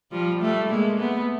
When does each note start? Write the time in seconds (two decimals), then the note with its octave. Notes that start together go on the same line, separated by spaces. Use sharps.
0.12 F3 G3
0.41 G3 A3
0.70 G#3 A#3
0.99 A3 B3